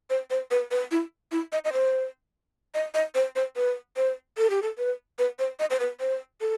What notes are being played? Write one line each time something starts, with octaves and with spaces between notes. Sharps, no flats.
C5
C5
B4
B4
E4
E4
D#5
D#5
C5
D#5
D#5
C5
C5
B4
C5
A4
G4
A4
B4
B4
C5
D#5
C5
B4
C5
A4